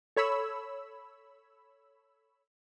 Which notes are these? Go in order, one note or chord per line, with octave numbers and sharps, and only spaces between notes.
A4 C#5 B5 E6